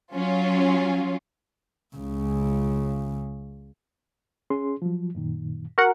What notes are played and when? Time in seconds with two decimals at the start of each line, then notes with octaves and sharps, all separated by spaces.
0.14 F#3 C#4 F4
1.96 C#2 C#3
4.50 C#4 G#4 C6
4.82 F3 F#3
5.15 F#2 A#2 D#3
5.78 F#4 A#4 F#5